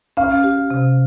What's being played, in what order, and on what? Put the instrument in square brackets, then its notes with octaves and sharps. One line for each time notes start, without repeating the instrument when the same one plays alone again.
[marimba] C#4 [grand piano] F5
[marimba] G4
C3